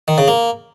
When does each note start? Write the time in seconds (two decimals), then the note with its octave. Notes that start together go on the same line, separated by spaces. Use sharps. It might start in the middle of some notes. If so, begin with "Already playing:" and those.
0.08 D#3
0.18 C#3
0.28 A#3